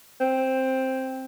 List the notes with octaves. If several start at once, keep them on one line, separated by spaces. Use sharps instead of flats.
C4